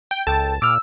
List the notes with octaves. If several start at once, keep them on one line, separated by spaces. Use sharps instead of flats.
G5
C#2 A4 G5 A5
A#2 D6 E6 F6